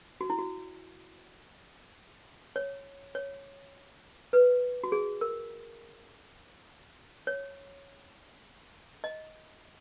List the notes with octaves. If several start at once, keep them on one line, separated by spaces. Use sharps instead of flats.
F#4
E4
F#4
C#5
C#5
B4
F#4
G#4
A#4
C#5
D#5